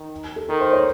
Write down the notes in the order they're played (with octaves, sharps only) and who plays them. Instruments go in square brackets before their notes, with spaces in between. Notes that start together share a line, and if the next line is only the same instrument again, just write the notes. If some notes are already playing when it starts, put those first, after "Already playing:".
Already playing: [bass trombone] D#3
[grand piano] A4
[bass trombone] D#3 [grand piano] A#4
[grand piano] C5
C#5